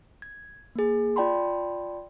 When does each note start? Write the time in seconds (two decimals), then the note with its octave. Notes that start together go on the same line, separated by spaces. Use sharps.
0.22 G#6
0.75 A#3 G#4
1.16 F4 D5 G5 A5 B5 C6